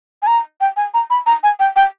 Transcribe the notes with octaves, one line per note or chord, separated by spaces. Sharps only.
G#5
A#5
G5
G#5
A#5
B5
A#5
G#5
G5
G5